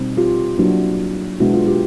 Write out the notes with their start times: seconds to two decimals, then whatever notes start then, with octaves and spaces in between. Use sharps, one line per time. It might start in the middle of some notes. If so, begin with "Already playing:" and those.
Already playing: B2 G3 C4 D#4
0.17 F4 G4
0.58 F#3 A#3 D4 E4 F#4
1.40 B2 G#3 B3 D4 E4 F#4
1.54 F4 G4
1.67 F4 G4